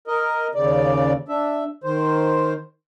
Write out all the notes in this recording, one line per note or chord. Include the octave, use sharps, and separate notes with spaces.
A#4 D#5
D#2 C#3 D5
D4 E5
D#3 C5